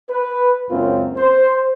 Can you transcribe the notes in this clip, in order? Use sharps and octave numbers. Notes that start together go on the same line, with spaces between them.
B4
C#2 F#2 A#3 C4 C#4 F4
C5